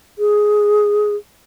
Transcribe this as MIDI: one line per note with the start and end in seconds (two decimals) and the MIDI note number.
0.19 1.16 68